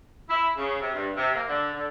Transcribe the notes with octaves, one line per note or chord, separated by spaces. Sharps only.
E4
C#3
C3
G2
C3
A#3
D3
D3